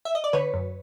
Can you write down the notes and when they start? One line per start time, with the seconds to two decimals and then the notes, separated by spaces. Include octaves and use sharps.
0.05 E5
0.15 D#5
0.24 D5
0.33 D3 B4 C#5
0.54 F#2